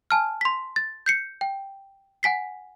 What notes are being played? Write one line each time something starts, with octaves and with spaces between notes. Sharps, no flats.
G#5 A5 F6
C6 B6
A6
G6 C7 C#7
G5
F#5 G#5 B6 C7